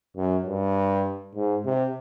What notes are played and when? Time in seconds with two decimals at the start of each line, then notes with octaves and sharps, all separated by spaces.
0.17 F#2
0.47 G2
1.35 G#2
1.65 C3